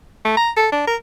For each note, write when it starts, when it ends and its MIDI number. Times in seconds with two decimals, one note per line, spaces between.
0.25 0.33 57
0.37 0.51 82
0.57 0.69 69
0.72 0.86 62
0.87 0.96 70